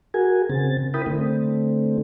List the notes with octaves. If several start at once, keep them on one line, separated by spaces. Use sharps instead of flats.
F#4 G#4 A#4 G#5
C#3 C4 A6
E4 A#4 G5 B5 D#6
D3 A3 C4